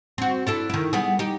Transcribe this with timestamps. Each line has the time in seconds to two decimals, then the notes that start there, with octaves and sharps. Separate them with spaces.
0.18 C4 F#4
0.47 D4 E4 A4
0.70 D#3 E4
0.93 G3 B3 G#4
1.19 D#4 G4